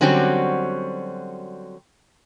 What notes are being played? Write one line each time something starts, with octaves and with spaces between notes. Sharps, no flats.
D3 F#3 G3 C4 C#4 F#4